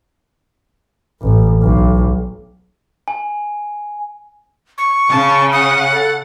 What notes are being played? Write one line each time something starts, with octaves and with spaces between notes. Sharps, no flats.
A1
B1
G#5
C#6
C#3 A5
F#5 D#6
A4